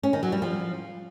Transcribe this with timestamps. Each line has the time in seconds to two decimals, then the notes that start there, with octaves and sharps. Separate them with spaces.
0.03 C#4
0.13 D#3
0.23 F#3
0.32 G3
0.42 F3